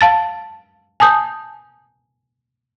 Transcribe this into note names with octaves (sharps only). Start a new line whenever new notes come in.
F5 A5 A6
G#5 A5 D#6 G6